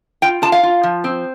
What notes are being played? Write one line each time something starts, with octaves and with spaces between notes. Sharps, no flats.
F4 G5
F4 A5
F5
F4
F3
C4